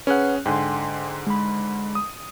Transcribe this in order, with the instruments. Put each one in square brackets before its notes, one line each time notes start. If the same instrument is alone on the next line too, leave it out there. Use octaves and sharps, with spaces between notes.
[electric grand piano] C#4 G#4 F#6 [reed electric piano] B4 F#5
[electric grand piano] G#2 D3 [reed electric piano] G5 G#5 C6
[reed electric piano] G#3 B5
[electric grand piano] D#6